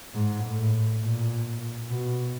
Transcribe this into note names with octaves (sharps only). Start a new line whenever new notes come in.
G#2
A2
A#2
B2